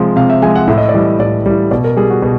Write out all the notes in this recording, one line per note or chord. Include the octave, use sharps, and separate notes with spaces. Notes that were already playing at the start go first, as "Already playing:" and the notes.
Already playing: C3 F3 G#3
C3 F5
E5
F3 G#3 G#5
F#5
A2 E5
D#5
D5
E3 G3 D#5
A2 D5
E3 G3
B2 D5
A#4
G3 G#4
F#4
B2